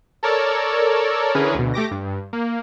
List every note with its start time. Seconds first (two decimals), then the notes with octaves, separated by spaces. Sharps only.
0.23 A4 A#4 C#5 D5 E6
1.35 D3 E3 C#4 G#4 A#4 B4
1.55 D2 B2
1.74 A3 G4 D6 A#6
1.91 G2
2.33 A#3